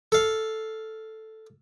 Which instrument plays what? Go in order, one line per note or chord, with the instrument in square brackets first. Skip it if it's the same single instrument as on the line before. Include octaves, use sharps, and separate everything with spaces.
[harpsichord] A4 F5